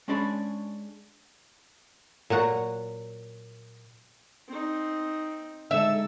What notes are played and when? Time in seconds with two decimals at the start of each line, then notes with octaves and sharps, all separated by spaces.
0.08 G#3 C#4 D4 G#4 D5 B5
2.30 A#2 F#3 F#5 A#5
4.48 C4 D#4
5.71 D3 G#3 D#4 A4 E5 E6